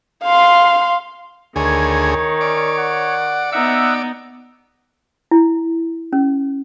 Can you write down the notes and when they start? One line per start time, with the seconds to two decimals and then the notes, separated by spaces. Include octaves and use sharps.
0.24 F5 C6
1.56 D2 D#3 G#4 C#5
2.41 C#4 D5
2.78 F#5
3.52 B3 D#4 E5 F#5 E6
5.31 E4
6.13 C#4